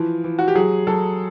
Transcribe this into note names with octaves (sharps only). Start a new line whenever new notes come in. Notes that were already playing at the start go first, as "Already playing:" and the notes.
Already playing: E3 F3
E3
F#4
G4
F#3 G#4
F#3 A4